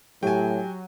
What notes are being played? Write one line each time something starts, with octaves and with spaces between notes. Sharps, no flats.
A2 F#3 G4 G5 G#5